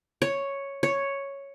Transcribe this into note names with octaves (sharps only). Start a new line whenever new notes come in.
C#5
C#5